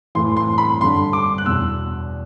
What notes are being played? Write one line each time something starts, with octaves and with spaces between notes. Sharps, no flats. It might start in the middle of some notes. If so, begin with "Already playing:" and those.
A2 E3 C6
C6
B5
G2 D3 C6
D6
F#6
E2 B2 E6